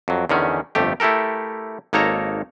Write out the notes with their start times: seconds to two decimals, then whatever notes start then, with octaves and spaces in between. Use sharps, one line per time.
0.08 F2 F#3
0.29 E2 D3 D#3 C#4
0.75 G1 F2 A3 G4
1.00 A3 E4 G4 A4 A#4
1.93 G#1 A#3 D#4 A4 C#5 A#5